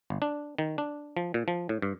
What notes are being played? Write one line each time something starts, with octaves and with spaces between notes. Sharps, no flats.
G1
D4
D#3
D4
F3
A#2
F3
A2
G2